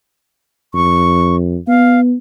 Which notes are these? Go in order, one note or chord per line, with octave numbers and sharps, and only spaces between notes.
F2 C#6
B3 F5